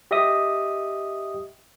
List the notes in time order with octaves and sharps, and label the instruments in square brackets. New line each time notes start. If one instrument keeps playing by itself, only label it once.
[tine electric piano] G4 D#5 E5 D#6